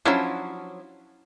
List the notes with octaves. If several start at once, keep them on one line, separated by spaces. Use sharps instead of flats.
F3 F#3 C#4 D4 E4